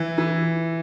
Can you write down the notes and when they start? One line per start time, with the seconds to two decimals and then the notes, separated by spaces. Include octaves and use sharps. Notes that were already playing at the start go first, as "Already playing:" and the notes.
Already playing: E3
0.18 E3